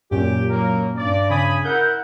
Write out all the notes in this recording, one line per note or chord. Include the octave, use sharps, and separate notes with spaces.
F#2 A#2 C#4 G4
F#3 A#3 A#4
G2 D5
C#3 G#5 B5 D#6
E4 A#4 F#5 G6